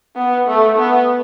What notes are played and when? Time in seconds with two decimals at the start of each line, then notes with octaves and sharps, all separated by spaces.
0.16 B3
0.47 A3
0.78 B3